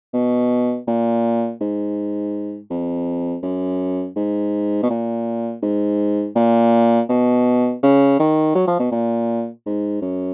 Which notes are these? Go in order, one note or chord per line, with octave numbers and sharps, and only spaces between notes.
B2
A#2
G#2
F2
F#2
G#2
B2
A#2
G#2
A#2
B2
C#3
D#3
F#3
F3
B2
A#2
G#2
F#2